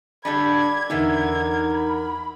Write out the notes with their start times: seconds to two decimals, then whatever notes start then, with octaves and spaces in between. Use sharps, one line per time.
0.25 D3 G3 D4 B5 G#6
0.90 E2 D3 E3 B3 D#4 A#4 G#6
1.74 B5